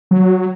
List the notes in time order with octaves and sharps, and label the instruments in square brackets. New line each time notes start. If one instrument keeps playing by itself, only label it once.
[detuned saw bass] F#3